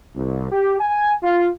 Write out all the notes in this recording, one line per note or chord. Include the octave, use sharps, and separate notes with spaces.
C2
G4
G#5
F4